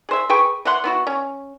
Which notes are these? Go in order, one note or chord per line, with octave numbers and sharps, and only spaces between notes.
G#4 C5 E5
G#4 B4 G5 C#6
E3 E4 F#5 C6
B3 E4 F#4
C#4